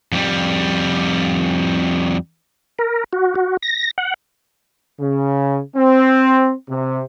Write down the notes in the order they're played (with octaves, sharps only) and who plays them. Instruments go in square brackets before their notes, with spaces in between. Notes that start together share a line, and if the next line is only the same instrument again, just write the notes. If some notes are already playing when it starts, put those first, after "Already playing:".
[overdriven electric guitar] F2 G3
[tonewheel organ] A#4
F#4
F#4
A#6
F#5
[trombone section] C#3
C4
C3